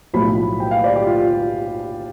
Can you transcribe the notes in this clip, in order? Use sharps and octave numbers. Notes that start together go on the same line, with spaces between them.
B1 A2 F3 B5
G5
F5
D5
G4
F4